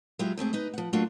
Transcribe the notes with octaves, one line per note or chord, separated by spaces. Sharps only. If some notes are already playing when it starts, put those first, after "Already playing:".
F#3 G#3 E4 F4 G4
G#2 A3 C4 G#4
D#4 B4 D#5
F3 F#5
F#3 A3 A#3 D4 F4 F#4